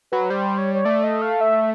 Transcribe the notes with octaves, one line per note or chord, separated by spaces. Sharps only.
F#3 B4
G3 C5
C#5
C#5
A3 D5
D#5
F5
E5